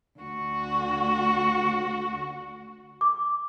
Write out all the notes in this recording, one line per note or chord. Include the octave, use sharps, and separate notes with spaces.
D2 F#4
D6